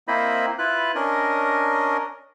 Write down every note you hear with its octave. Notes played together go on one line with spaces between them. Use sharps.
A#3 C4 E4 C5 D#5 B5
E4 F4 B4 F#6
C#4 D4 A#4 D#5